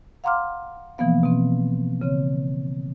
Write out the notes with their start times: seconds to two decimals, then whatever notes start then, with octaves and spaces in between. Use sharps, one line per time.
0.24 F5 F#5 A#5 C6 D6 F6
0.98 B2 E3 F3 A#3 B3 F5
1.23 B2 C4
2.01 C#3 C4 C#5